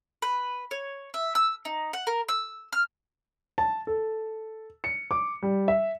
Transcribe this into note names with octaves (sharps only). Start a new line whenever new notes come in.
B4
C#5
E5
E6
D#4
F#5
A#4
E6
F6
A5
A4
C#7
D6
G3
E5